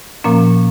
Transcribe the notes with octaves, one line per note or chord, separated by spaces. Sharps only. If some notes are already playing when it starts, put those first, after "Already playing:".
A#2 F3 A#3 C#4